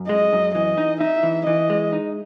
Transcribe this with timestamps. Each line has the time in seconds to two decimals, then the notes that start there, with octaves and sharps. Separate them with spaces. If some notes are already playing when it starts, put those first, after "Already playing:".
Already playing: F#2
0.09 G#3 D#5
0.33 F#2
0.55 E3 D#5
0.78 D#4
1.01 D#4 E5
1.23 E3
1.47 E3 D#5
1.70 G#3
1.93 D#4